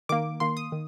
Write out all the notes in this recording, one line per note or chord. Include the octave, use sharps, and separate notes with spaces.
D#3 A#3 D6
D#3 A#3 C6
D#6
D#3